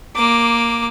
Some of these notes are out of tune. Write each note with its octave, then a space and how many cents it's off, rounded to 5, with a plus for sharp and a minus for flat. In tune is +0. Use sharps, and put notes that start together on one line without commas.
A#3 +0 D6 +0